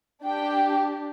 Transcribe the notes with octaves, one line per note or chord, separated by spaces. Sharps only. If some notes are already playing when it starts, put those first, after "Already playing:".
D4 G4 G5